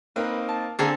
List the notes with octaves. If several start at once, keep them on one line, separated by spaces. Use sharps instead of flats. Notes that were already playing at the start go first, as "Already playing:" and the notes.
A#3 C4 D#4 A#4 B4
A5
D3 A#3 C4 G#4 A4 G#5